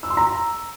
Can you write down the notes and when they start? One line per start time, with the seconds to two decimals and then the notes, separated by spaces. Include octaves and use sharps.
0.03 E6
0.10 C6
0.17 A#5